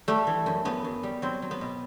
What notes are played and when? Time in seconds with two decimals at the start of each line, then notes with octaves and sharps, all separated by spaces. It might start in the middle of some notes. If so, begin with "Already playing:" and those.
0.08 G3 A3
0.27 E3
0.46 F#2
0.65 F#2 B3
0.84 F#2
1.03 G3
1.22 F#3 C4
1.42 F#3
1.51 B3
1.61 B2